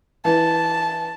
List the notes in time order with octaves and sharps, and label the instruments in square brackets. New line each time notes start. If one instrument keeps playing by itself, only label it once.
[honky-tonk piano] E3 [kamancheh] A5